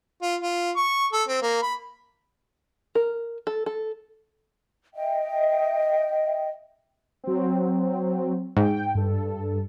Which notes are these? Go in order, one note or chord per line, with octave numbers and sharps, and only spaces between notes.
F4
F4
C#6
A4
C4
A#3
B5
A#4
A4
A4
D#5 E5 G5
F#3 C4
G#2 G5
G2 A4